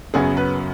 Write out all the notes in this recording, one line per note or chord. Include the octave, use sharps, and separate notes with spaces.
F#2 C#3 F#3 B3 G#4
B4